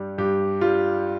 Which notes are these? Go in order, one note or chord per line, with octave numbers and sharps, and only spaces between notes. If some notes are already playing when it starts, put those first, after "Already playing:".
Already playing: G2 G3
G2 G4
G3 F4